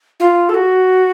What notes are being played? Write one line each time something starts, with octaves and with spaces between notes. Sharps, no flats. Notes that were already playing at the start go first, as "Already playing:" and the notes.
F4
A4
F#4